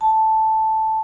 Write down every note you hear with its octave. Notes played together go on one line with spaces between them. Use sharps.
A5